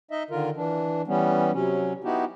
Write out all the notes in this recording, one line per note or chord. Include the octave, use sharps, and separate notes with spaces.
D#4 D#5 E5
D3 D#3 F4 A#4
E3 D4
E3 G3 B3 C#4
C3 F#3 C#4
B3 D#4 E4 F#4 G4